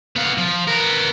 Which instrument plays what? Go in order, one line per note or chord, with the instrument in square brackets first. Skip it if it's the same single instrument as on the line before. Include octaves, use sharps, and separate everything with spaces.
[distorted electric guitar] B3 F5
F3
B3 A#4